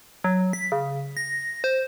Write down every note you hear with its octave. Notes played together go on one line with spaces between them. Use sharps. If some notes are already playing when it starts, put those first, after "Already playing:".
F#3
B6
C#3
A#6
C5